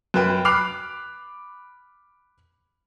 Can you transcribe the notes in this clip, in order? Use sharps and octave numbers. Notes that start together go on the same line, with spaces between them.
F#2 B4 G5
B5 D6 F6 F#6 C7 F7